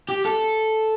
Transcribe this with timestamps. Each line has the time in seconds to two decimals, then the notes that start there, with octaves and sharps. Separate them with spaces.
0.09 G4
0.25 A4